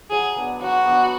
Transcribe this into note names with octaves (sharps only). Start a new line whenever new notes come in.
F#3 G#4
B3 D4
F#3 F#4
B3 D4